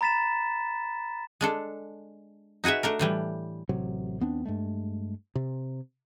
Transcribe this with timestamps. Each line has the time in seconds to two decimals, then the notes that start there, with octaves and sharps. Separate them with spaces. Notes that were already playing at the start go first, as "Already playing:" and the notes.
0.01 A#5 B5 A6 B6 E7
1.41 G#3 D4 A4
2.64 D#4 F#4 G#4 B4 E5
2.83 A3 D4 A#4
2.99 A2 E3 G3
3.69 A1 C3 F#3
4.20 D#2 B3 C4 D4
4.45 G2 G#3 A3
5.35 C3